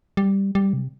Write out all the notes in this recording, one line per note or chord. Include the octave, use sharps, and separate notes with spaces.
G3
G3
C3